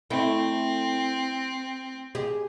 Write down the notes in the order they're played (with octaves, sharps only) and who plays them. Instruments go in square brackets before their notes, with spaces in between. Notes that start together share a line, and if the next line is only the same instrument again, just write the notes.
[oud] A3 E4 [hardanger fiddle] C4
[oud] G4 G#4